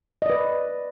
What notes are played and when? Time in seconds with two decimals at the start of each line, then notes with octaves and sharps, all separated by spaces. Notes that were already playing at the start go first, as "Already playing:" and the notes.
0.22 D#5
0.26 D5
0.30 B4